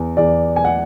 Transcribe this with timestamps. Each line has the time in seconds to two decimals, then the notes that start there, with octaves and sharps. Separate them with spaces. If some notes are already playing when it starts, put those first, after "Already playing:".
Already playing: E2
0.17 E2 D5
0.56 G#5
0.65 F#5